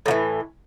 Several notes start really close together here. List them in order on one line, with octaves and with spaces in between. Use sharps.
A2 F3 E3